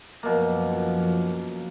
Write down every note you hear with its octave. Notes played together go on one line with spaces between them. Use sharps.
F#2 B2 F3 A#3